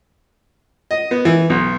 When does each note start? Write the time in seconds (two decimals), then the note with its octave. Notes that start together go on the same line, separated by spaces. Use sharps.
0.91 D#5
1.11 B3
1.25 E3
1.50 B1